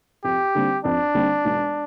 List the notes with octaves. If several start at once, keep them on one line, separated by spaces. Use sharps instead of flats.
F2 G4
D3 G3 C4
F2 D4
D3 G3 C4
E1